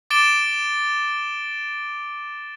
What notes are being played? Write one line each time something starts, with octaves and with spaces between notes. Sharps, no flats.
D6 A6 D7 E7 G7